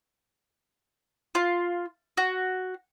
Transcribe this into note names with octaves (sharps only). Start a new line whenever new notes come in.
F4
F#4